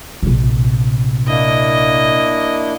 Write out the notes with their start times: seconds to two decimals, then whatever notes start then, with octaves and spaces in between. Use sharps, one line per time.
0.23 A#1 C3
1.27 A#3 D4 E4 D#5